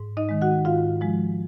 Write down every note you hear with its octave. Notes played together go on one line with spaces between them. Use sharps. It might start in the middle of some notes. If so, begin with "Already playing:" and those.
Already playing: G#2
D#4 D#5
D#3 G#3
F#4 F#5
G#2 F4 F5
F3 G#3